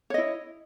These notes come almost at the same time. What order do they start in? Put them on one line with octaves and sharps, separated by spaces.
C#5 D#5 E4